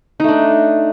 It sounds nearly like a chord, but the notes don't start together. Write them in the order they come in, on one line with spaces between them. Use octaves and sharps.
D#4 A3 D4